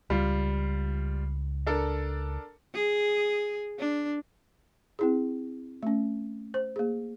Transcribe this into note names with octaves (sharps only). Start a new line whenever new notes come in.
C#2 G3 F4
D4 A4 A#4
G#4
D4
C4 E4 G#4
A3 C#4
C5
A#3 G#4